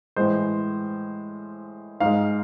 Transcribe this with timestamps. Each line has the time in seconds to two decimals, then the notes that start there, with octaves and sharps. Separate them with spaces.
0.16 A2 E3 G#3 C5
2.00 G#2 G#3 F5